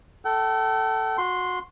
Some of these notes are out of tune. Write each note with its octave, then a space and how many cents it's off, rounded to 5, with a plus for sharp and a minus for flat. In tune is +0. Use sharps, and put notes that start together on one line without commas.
A4 +0 G5 -45
F#4 -25 C6 +0